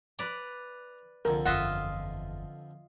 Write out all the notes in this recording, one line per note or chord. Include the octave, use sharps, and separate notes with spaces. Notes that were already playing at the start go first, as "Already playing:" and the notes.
B4 D5 A#5
C2 F2 D3 A#4
F#1 E2 F4 D#5 E5 F#5